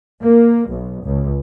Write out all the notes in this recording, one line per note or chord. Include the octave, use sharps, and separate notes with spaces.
A#3
B1
C#2